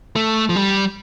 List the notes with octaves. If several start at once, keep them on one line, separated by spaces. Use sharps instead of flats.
A3
F3
G3